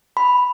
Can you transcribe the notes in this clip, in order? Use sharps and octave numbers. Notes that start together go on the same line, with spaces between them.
B5